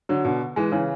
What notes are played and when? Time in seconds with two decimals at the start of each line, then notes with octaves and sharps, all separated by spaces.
0.09 D3 F#3
0.24 B2 D3
0.56 E3 G#3
0.72 C#3 E3